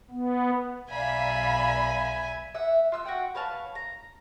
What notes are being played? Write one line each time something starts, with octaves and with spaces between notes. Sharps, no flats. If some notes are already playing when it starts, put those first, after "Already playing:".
B3
B1 D5 E5 F5 G#5 A#5 B5
E5 F#5
F4 E6 F#6
F#4 F#5 G5
B4 C#5 F5 A5
A#5